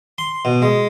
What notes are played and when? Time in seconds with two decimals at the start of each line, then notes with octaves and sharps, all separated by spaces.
0.18 C6
0.45 B2
0.62 G#3